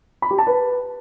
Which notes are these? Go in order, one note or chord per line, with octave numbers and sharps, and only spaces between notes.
B5
G4
A5
B4